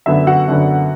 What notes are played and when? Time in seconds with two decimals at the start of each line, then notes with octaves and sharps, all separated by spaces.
0.06 F#2 D3 F#3 B3 E5
0.27 F#4 F#5
0.48 F#2 D3 F#3 B3